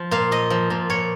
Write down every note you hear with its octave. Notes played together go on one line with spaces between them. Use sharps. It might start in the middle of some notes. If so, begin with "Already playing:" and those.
Already playing: F3
A#2 F5
F3 D#5
F3
A#2
A#2 C#5